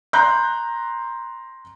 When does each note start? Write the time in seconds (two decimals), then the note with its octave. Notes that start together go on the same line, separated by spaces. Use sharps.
0.13 A#5 C6 F#6 G6